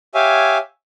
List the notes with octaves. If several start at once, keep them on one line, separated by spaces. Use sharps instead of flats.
G4 C#5 E5 F5 G#5